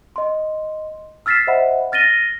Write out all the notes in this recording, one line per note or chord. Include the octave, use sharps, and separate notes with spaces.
D#5 C6
E6 F6 A6 B6 C7 E7
C5 D#5 E5 F#5 B5
F6 A6 A#6 D#7 G7